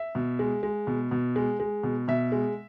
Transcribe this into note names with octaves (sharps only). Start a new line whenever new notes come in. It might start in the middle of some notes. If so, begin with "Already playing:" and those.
Already playing: E5
B2
G#3
G#3
B2
B2
G#3
G#3
B2
B2 E5
G#3